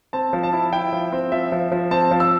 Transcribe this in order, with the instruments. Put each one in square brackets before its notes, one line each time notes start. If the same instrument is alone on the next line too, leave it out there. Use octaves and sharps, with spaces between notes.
[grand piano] C4 A5
F3
A5
E4
E4 G5
F3
C4
F3 E5
F3
F3
C4 A5
F3
E6